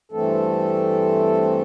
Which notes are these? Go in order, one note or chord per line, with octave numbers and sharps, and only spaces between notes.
G2 E3 A3 C4 A4